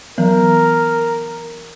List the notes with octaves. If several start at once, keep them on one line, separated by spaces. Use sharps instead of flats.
E3 F#3 B3 A#4